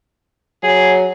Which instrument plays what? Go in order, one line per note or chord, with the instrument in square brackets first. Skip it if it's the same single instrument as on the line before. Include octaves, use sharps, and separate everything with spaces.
[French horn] F#3 [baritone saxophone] G#4